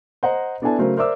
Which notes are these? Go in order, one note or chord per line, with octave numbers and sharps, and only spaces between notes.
C5 D#5 F#5 A#5
B3 D4 E4 A4 G#5 A5
C#3 F#3 A3 A#4 C5
A#4 C5 D5 E5 D6 E6